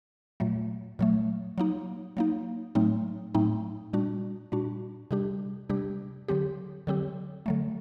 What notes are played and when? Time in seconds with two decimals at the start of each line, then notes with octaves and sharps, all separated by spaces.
0.40 A#2 F#3 A3
0.99 A#2 F#3 A3
1.58 F#3 A#3 D#4
2.17 F#3 A#3 D#4
2.75 A2 F#3 A3 C4 D#4
3.35 A2 F#3 A3 C4 D#4
3.93 A#2 G3 D4 F#4
4.52 A#2 G3 D4 F#4
5.11 C3 G3 D4 G4
5.69 C3 G3 D4 G4
6.28 D3 F#3 C4 G4
6.87 D3 F#3 C4 G4
7.46 D3 F#3 A3